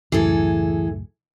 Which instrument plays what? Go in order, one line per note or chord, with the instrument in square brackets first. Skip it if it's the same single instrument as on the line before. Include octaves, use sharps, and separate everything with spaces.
[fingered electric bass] C#2 F#2 A2 [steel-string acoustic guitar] E3 G#4 A4